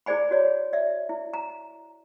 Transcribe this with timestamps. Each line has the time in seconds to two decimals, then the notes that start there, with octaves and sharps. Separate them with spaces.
0.06 E4 G#4 C5 D5 G#5 B5
0.31 F#4 C#5 D5
0.73 D5 E5
1.09 E4
1.34 A#5